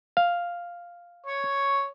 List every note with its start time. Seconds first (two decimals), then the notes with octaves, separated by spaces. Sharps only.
0.17 F5
1.26 C#5 C#6